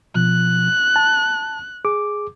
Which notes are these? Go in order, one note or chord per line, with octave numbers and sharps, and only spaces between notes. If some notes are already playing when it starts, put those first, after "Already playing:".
B2 F3 F#6
A5
G#4 D6